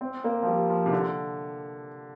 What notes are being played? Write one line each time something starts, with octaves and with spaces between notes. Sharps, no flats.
C4
A#3
F3
G3
F3
C3
D3